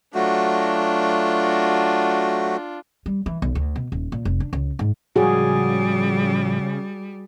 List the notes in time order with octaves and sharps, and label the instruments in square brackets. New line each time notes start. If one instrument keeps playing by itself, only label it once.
[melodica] F#3 A3 F#4 [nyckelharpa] D4 F4
[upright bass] G3
E3
B1
D2
B2
D#1
A#2
F1
D4
C#2
G#2
[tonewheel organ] A2 F3 [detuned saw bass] C#3 [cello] G3 [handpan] F#4 G#4